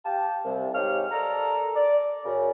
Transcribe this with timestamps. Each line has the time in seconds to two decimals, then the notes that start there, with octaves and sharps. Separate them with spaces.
0.05 G4 F5 A5
0.45 C2
0.74 G#2 G#3 G4 C#5 F5 F6
1.11 A4 A#4 D5 A5 A#5
1.76 D5
2.24 F#2 C#3